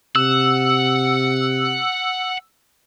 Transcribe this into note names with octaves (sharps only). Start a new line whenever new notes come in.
C3 F#5 E6